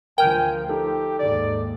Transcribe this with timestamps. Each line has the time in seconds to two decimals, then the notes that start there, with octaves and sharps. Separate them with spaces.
0.18 D2 F3 A#4 G5 G#5 F6
0.69 D#4 G4 A4
1.19 D#2 G#2 D5